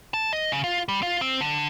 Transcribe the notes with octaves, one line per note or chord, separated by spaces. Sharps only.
A5
D#5
C#3
F4
G3
F4
C4
D3